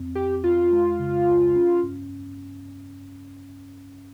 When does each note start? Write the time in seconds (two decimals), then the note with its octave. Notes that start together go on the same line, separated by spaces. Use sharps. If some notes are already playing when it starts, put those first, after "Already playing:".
Already playing: F2 C4
0.15 F2 G4
0.44 F2 F4
0.72 G#3
0.99 C#3
1.27 C#2
1.55 C#4
1.83 G2